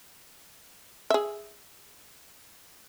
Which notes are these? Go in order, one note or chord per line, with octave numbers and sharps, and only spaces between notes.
G#4 E5